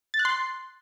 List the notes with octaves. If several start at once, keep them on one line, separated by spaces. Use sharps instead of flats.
A6
F#6
C6